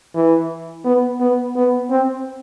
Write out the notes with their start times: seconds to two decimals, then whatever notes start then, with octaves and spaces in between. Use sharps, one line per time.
0.15 E3
0.85 B3
1.20 B3
1.56 B3
1.90 C4